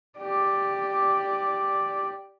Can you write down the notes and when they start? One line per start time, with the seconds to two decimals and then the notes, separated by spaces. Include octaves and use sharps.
0.19 G4 D5